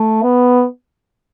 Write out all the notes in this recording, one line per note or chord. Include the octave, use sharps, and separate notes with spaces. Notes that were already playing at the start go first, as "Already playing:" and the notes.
Already playing: A3
B3